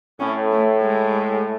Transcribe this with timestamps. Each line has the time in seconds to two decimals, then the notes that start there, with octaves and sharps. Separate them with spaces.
0.20 A2 C#4
0.52 A3
0.82 G#3